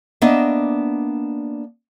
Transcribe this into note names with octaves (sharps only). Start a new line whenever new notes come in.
A#3 B3 D4 D#5 E5